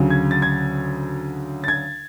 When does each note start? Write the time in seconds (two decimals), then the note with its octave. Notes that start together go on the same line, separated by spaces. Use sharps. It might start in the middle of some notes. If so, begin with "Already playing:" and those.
Already playing: D2 C#3 F#3
0.10 G#6
0.31 A6
0.42 G#6
1.64 A6
1.68 G#6